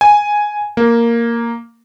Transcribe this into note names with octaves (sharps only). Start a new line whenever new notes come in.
G#5
A#3